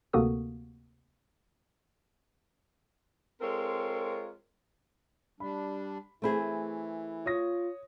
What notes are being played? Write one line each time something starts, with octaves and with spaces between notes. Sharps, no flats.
D2 C3 A#3 F#4 A4 D#6
G#3 C4 F4 A4 A#4 C#5
G3 D4 B5
E3 A3 C4 G#4 E5 B5
F4 C#5 D#6 A#6